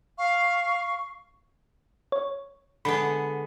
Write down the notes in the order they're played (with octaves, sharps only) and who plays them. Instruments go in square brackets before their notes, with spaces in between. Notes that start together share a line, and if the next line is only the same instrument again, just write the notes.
[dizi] F5 [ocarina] C#6
[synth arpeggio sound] C#5
[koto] D3 G#3 B3 [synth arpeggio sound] B5